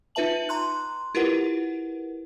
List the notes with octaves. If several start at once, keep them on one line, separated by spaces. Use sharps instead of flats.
D#4 F4 B4 E5 A5 F#7
A#5 C6 F#6
E4 F4 G4 A#4 B4 F#5